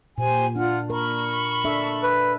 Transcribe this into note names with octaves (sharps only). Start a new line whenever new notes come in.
A#2 G4 C5 G#5
D4 F4 F#5 F6
A#4 B5 C#6
D4 A4 E5
B4